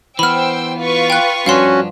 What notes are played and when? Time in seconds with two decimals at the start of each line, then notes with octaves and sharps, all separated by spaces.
0.19 E3 B3 C5 G5 B5 E6 F6
0.79 F4 B4 C#6
1.10 G5 F#6
1.46 G2 F3 C#4 D4 F#4 F5 F#5 C6